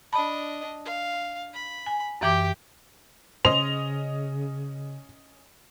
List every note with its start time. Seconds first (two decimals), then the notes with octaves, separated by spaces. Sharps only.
0.13 D4 D#5 A5 B5
0.86 F5
1.53 B5
1.86 G#5
2.21 F#2 E3 G4 G5 D6
3.45 C#3 C#4 C5 D#5 F7